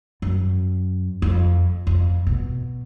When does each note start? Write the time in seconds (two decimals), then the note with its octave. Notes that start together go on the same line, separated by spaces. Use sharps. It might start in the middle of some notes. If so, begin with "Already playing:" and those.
0.22 F#2
1.22 F2
1.87 F2
2.27 B2